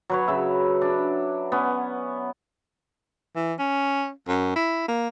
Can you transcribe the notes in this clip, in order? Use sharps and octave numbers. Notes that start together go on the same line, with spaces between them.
F#3 B4 C#5
C#3 E5
D4
B3 C#4
E3
C#4
F#2
E4
A#3